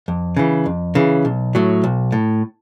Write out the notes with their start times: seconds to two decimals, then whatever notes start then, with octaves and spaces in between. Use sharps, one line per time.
0.08 F2
0.37 C#3 E3
0.66 F2
0.95 C#3 E3
1.25 B1
1.55 A2 F#3
1.84 B1
2.12 A2